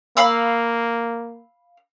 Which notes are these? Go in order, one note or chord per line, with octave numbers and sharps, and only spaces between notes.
A#3 F5 B5 E6